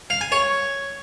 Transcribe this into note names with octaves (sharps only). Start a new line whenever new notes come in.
F5
G#5
C#5